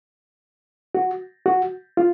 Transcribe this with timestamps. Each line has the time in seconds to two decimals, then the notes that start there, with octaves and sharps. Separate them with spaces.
0.95 F#4
1.46 F#4
1.97 F4